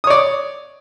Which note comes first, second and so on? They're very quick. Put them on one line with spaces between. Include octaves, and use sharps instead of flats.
D#6 C#5 D5